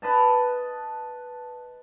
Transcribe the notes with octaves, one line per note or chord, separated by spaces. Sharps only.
B4 D#5 A5